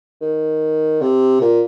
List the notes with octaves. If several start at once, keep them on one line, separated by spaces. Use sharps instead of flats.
D#3
C3
A#2